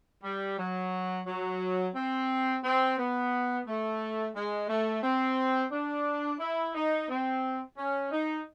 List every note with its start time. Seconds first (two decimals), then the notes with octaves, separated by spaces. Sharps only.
0.23 G3
0.58 F#3
1.26 F#3
1.95 C4
2.64 C4
2.97 B3
3.67 A3
4.35 G#3
4.69 A3
5.03 C4
5.72 D4
6.40 E4
6.75 D#4
7.09 C4
7.77 C#4
8.11 D#4